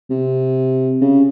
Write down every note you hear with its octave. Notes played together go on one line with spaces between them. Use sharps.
C3
C#3